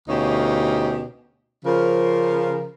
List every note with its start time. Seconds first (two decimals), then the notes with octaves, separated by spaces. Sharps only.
0.09 D2 B2 C#4 D#4 G4 F5
1.65 C#3 F3 A#4